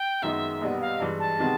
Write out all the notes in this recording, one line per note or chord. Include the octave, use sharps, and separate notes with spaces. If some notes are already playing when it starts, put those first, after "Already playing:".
Already playing: G5
F#2 D#3 G#3 B3 D#4 E5
B1 A#2 G3 B3
F5
G2 E3 G#3
A5
C3 D#3 G#3 B3